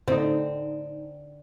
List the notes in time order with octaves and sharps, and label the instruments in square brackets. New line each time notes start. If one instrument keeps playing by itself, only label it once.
[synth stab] A2 D#4 [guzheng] D3 [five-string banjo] C4